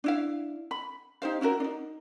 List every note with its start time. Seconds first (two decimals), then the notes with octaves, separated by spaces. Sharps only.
0.04 D4 E4 F5
0.71 B5
1.22 D#4 G4 C5 F5
1.41 C#4 E4 F#4 A#4
1.60 D4 D#4